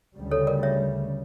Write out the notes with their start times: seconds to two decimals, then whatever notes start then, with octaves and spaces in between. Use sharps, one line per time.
0.16 D2 C#3 G3
0.31 A4 C#5
0.47 A#4 D5
0.63 C#5 E5